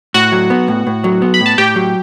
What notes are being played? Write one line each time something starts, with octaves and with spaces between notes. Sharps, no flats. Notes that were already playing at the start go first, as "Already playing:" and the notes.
A2 F#4 F#5
F#3
B3
A2
A2
F#3
B3
B5
A2
A5
A2 G4 G5
F#3